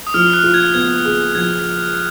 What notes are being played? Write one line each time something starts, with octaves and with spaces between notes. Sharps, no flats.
D#6
F3 F6
F#6
F4
G#6
B3 G#6
G#4
F3 G#6